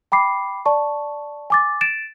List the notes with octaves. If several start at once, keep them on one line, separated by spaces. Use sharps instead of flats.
G5 B5 D6 C7
D5 A5 C#6
G#5 D6 A6
A6 D7 E7